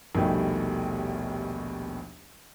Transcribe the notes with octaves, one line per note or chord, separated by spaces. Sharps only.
A#1 D#2 B2 D#3 G3 A3